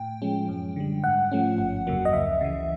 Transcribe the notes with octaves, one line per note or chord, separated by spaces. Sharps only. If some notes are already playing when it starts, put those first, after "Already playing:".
Already playing: A2 G5
F3 G#3 C#4
F#2
D3 G3
G#2 F#5
F3 A3 C#4
G1
F2 C#3 F#3 A#3
D#5
C#2 E5
C#3 E3